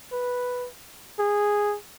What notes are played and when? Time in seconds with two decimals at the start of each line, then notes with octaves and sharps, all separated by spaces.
0.12 B4
1.20 G#4